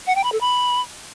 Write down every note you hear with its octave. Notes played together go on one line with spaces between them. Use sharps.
F#5
G5
B5
A4
B5